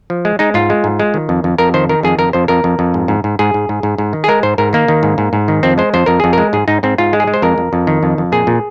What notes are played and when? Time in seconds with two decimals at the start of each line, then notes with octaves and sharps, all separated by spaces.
0.10 F3
0.25 G#3
0.39 G#3 D#4
0.54 G#2 F4
0.70 G#3
0.84 G#2
1.00 G#3
1.14 D#3
1.29 F2
1.44 F2
1.58 F2 A#4
1.74 D#3 C5
1.89 D#3 A#4
2.03 F2 G#4
2.18 F2 A#4
2.33 F2 C5
2.48 F2 A#4
2.64 F2
2.79 F2
2.94 G#2
3.08 G#2
3.24 G#2
3.39 G#2 G#4
3.54 G#2
3.69 G#2
3.83 G#2
3.98 G#2
4.13 D#3
4.24 G#4
4.28 G#3 A#4
4.43 G#2 C5
4.58 G#2 A#4
4.73 D#3 A#3
4.88 D#3
5.03 G#2
5.18 G#2
5.33 G#2
5.48 D#3
5.63 F2 C4
5.78 G#3 C5
5.94 F2 C5
6.06 F2 A#4
6.20 F2 G#4
6.33 G#3 A#4
6.53 G#2 G#4
6.68 G#2 D#4
6.83 G#2 C4
6.98 G#2 F4
7.13 G#3
7.20 G#4
7.27 G#3
7.34 C5
7.42 F2 A#4
7.58 F2
7.73 F2
7.87 D#3
8.03 F2
8.18 F2
8.32 A#2 G#4
8.47 A#2